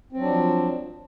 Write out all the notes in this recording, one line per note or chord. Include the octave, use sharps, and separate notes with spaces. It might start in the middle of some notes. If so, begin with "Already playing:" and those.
F3 F#3 C4 D4